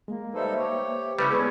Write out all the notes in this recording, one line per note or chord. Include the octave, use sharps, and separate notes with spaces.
G#3 A#3
G3 D#4 A4 B4 C5 E5
G4 C#5
C#3 G3 A3 C#4 E4 B4 G#6
G#3 B3 G#4 D5